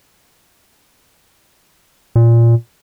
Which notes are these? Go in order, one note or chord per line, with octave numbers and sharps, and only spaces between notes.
A#2